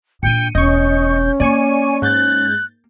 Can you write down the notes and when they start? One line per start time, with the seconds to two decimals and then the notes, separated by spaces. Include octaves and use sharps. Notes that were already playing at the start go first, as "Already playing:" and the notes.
0.23 A#2 D4 G5 C#7 D#7
0.55 E1 C#4 D#5 C#6 G6
1.40 A#3 D5 G#5 C#6 D#7
2.02 G#2 F#6 G6 A6